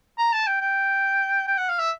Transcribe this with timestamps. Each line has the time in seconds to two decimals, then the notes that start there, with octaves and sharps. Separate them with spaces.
0.18 A#5
0.33 A5
0.47 G5
0.61 G5
1.47 G5
1.58 F#5
1.69 F5
1.79 E5